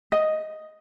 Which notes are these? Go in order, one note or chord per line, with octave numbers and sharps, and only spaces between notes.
D#5